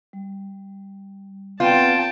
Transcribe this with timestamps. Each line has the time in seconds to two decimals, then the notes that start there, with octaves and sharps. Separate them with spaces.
0.13 G3
1.60 B3 C4 F4 B4 D5 G5 A5